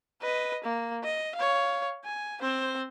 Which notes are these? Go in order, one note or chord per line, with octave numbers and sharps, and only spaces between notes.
B4 D#5
A#3
D#5
C#5 F5
G#5
C4 C5